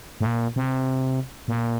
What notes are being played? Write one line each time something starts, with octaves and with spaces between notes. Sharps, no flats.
A2
A#2
C3
A#2